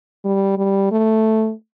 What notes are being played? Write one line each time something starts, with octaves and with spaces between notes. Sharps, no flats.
G3
G3
A3